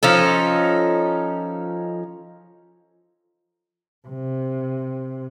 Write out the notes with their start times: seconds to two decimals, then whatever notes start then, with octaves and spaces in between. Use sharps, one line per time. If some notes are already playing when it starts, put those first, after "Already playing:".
0.03 F3 C#4 D#4 A4
4.08 C3